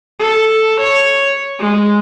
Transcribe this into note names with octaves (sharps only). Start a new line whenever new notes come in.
A4
C#5
G#3